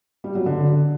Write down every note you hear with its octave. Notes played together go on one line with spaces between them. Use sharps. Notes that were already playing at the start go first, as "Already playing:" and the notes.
G3
F#3
D3